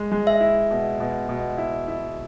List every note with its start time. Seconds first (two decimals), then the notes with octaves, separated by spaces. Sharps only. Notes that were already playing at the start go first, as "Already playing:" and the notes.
Already playing: G#3
0.12 G#3
0.27 E5
0.40 E4
0.71 B2
1.00 B2
1.29 B2
1.58 E4
1.88 E4